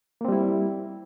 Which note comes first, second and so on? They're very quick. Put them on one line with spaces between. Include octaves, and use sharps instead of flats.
A#3 C4 G3 E4